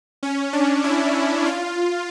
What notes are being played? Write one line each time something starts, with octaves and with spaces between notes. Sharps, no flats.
C#4
D4
E4
F4